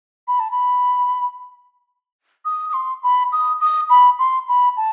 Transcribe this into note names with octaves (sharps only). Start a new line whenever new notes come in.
B5
A5
B5
D#6
D#6
C6
B5
D#6
D#6
B5
C6
B5
A5